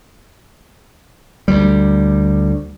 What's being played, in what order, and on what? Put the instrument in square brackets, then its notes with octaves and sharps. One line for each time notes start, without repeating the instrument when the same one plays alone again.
[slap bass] D2 G3